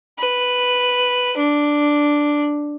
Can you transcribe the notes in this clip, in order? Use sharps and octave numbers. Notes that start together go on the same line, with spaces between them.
B4
D4